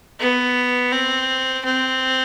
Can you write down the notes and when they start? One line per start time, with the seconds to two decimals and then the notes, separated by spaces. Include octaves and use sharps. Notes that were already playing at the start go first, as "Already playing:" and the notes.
0.20 B3
0.92 C4
1.65 C4